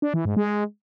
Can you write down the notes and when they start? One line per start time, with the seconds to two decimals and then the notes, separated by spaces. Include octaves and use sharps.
0.02 D4
0.14 E3
0.25 G#2
0.37 G#3